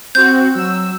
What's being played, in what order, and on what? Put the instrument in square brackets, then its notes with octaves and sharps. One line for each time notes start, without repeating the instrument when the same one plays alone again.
[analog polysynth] C4 F#4 [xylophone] G6
[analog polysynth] F#3 E6